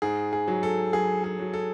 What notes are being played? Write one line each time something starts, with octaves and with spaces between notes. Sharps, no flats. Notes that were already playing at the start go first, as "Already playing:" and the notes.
G#2 G#4
G#4
F#3
A4
F#3 G#4
G#4
F#3
A4